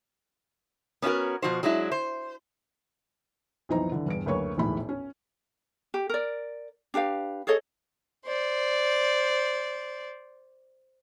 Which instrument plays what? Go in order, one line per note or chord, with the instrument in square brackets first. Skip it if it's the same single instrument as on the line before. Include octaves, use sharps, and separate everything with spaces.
[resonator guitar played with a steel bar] B3 C#4 D4 F4 F#4 A#4
B2 F3 F#4 C5
F#3 G#3 D4 E4
C5
[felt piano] B1 F2 E3 D#4 C5 A#5
D3 E3
E1 G2 D7
F#1 D2 A#3 B4 C#5 C#6
E1 A#1 D#2 A2 B5
C#4
[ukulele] G4
A#4 D5
D4 G4 B4 F5
G#4 A4 C#5 D#5
[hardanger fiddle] C5 D5